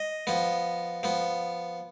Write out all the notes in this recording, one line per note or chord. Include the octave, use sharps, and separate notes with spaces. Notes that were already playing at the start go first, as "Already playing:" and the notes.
Already playing: D#5
F3 B3
F3 B3